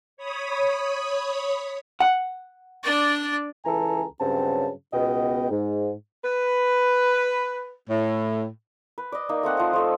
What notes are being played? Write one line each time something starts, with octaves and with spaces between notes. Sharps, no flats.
C#5 B5 D#6
F#5
D4 D5
C#2 E3 A4 G#5 A#5
G2 C#3 F#3 C4 A5
C#2 B2 B3 D#5 G5
G#2
B4
A2
B4
D5 D#5
A#3 D#4
A3 C4 F#5 G5
F3 F#5
F3 A3 A4